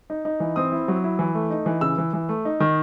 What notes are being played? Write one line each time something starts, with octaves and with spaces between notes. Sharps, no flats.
D#4
D#4
E3
C4 D#6
E4
F#3
E4
E3
A3
D#4
E3
C#3 E6
E3
E3
A3
D#4
D#3